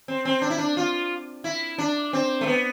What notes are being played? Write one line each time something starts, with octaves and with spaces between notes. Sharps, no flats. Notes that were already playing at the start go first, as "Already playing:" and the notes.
C4
C4
D4
E4
D4
F4
E4
D4
C4
A3
B3